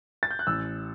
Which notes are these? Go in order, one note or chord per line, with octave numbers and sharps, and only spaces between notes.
A6
G6
F#6
A1 E6